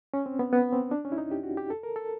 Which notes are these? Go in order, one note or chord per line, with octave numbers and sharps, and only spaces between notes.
C#4
C4
B3
B3
C4
D4
C#4
E4
D#4
G4
F#4
G4
A4
A#4
A4